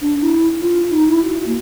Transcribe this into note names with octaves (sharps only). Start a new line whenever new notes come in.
D4
E4
F4
D#4
E4
F#4
A#3